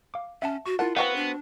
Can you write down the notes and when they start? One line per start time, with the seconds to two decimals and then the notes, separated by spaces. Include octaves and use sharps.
0.14 F5 D6
0.42 C#4 E5 F#5 A5
0.66 F#4 C#6
0.79 E4 F4 A#4 F#5 A5
0.97 B3 C4 F#4 B4 F5 G5 C7
1.16 D4